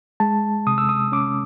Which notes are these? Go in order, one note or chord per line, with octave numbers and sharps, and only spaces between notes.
G#3 A5
C3 D#6
E6
D#6
C#4 D6